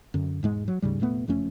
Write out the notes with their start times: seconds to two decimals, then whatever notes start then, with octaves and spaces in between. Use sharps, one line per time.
0.14 F#2 D3
0.43 E1 G#2 G#3
0.68 F#3
0.82 D2 G#2 C#3 G3
1.00 F1 A#2 A3 B3
1.28 F#1 F2 A3 C#4